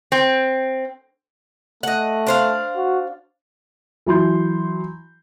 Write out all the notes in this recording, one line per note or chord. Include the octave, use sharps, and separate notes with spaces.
C4
A3 D#5 F#5
D4 C5 F5
F#4
E3 F#3 C6 G6